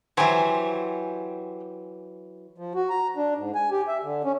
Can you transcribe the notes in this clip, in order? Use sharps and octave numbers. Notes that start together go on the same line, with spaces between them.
E3 F#3 G4 C5 G#5
F3
F#4
A#5
D4
G#2
G#5
G4
E5
D3
C#4